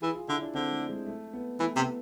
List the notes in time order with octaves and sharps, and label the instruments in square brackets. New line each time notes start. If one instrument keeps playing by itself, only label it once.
[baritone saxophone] E3 [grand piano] G#4
[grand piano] F4
[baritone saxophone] D3 [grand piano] E4
[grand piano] D4
[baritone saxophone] D3 [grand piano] C4
[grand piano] A3
G#3
A3
B3
[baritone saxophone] E3 [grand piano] A3
[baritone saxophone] C3 [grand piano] B3